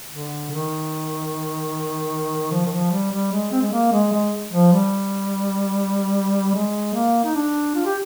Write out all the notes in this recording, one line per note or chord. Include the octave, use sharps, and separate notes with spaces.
D3
D#3
F3
D#3
F3
G3
G3
G#3
C4
G#3
A#3
G#3
G#3
F3
G3
G#3
A#3
D#4
D4
F4
G4